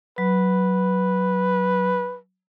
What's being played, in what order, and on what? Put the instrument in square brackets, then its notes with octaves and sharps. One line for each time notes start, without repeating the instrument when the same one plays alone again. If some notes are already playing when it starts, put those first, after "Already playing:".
[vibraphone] F#3 [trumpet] B4